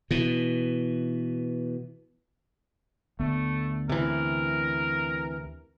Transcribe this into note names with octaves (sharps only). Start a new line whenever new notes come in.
B2 E3
D2 A3 B3
C3 E3 A#4